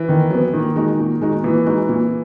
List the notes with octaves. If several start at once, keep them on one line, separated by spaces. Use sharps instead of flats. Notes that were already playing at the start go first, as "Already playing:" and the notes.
Already playing: E3
D#3
F#3 B3
A#2 D#3
G#3 D#4 F#4
A#2
G#3 D#4 F#4
A#2 E3
G#3 D#4 F#4
A#2